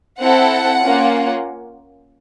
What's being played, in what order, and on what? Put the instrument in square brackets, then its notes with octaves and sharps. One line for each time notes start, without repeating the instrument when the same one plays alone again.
[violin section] C4 E4 A4 F#5
A#3 C#4 F4